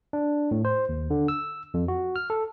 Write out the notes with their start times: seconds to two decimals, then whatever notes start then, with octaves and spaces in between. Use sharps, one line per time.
0.13 D4
0.51 A2
0.65 C5
0.89 D#2
1.10 D3
1.28 E6
1.74 F2
1.88 F#4
2.16 F6
2.30 A4